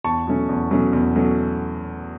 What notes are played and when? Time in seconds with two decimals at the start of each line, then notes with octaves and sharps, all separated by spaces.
0.04 E2 A5 C#6
0.27 B2 F#3 A3 C#4
0.49 E2
0.70 B2 F#3 A3 C#4
0.93 E2
1.15 B2 F#3 A3 C#4